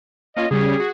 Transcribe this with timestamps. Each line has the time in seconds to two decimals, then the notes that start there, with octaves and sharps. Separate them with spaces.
0.37 A#3 C#4 F4 D#5
0.51 C#3 G3 C#4 G#4
0.80 F#4